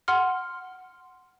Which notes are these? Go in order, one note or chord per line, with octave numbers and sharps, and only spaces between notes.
F#5 C6 F6